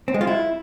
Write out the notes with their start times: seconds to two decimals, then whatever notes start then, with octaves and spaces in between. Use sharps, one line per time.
0.08 C4
0.14 G#3
0.21 F4
0.27 E4